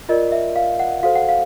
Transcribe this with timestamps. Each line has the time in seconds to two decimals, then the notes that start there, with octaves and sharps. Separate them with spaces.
0.09 F4 A#4 D5 D#5
0.32 E5
0.56 F5
0.79 F#5
1.03 F#4 A4 C5 F5
1.15 F#5
1.29 F5